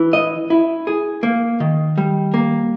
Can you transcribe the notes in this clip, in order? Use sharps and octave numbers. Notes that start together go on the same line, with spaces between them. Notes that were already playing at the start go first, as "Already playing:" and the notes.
Already playing: E3
D#5
E4
G#4
A#3
D#3
G3
A#3